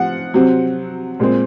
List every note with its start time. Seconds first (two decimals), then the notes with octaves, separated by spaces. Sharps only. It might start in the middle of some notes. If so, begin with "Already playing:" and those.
Already playing: F3 F#5
0.34 C3 F#3 C4
1.20 A#2 G#3 C4